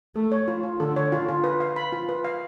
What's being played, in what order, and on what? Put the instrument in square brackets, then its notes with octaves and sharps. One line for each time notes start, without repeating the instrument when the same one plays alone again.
[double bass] A3 [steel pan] A4
[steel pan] C#5
F4
F4
[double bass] D3 [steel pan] A4
[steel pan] C#5
F4
F4
B4
F5
B5
F4
B4
F5